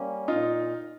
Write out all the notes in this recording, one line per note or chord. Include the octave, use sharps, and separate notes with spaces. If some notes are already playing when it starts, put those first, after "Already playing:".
Already playing: G3 A#3 C#4
A#2 D#4 F4